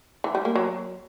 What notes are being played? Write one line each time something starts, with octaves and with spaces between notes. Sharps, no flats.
E3
G3
A#3
F#3